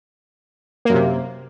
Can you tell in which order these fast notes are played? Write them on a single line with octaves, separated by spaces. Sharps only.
A#3 F#2 C3